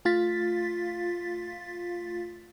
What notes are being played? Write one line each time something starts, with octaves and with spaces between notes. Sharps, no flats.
A3 F4 F5 A6 B6